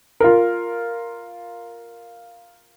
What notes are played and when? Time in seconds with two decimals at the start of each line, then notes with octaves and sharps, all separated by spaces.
0.20 F4 A#4